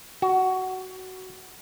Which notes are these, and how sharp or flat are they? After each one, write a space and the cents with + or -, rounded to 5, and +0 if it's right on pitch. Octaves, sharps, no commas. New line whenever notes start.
F#4 +15